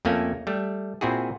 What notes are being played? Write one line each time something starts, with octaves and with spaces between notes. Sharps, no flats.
F2 A3 A#3 C#4 G#5
G3 A3
A#2 C4 E4 F#4 G#4